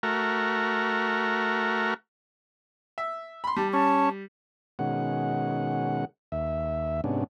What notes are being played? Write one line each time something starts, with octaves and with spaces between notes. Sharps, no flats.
A3 F#4 A#4
E5
B5 C6
G3 A5
C#4 A5
B2 D#3 G#3 C#4 F#5
D#2 E5
G#2 C3 B3 C#4 D4